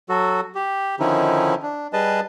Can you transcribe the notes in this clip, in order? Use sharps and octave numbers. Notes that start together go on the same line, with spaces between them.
F#3 F#4 A4
G4
D3 D#3 F3 C#4 D#4 E4
D4
G3 G#4 B4 D#5 A5